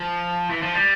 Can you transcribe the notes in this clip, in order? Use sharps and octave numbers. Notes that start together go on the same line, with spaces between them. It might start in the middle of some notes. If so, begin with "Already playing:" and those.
Already playing: F3
E3
F3
G3